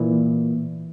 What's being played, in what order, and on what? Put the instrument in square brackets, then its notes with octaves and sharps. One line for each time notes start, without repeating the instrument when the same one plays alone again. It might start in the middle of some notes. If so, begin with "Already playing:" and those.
Already playing: [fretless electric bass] A#2 E3